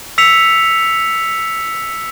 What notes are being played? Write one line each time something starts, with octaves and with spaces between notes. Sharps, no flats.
E6 B6 C#7 F7